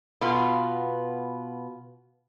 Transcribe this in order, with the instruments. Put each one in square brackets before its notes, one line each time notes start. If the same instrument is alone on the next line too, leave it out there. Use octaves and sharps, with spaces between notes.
[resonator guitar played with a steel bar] B2 B3 F4